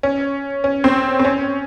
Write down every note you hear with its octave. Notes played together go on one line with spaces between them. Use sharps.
C#4
C#4
C4
C4
C#4